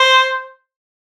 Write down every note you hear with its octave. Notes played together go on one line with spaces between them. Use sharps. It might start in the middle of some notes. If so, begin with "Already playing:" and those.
Already playing: C5